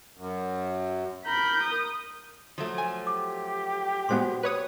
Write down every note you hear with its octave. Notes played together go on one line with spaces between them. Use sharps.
F#2
A#4 B5 G6
D#6
F3 F#3 A3
G#5
G4 D6
A#2 G#3 B3 F#4 C5 C6
B4 C#5 D#6